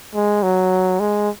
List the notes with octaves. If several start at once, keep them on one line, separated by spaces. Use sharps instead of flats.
G#3
F#3
G#3